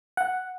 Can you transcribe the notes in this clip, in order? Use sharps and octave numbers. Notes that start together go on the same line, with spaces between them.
F#5